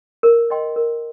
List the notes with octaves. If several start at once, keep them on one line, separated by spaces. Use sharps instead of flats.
A#4
D#5 G5 C6
A#4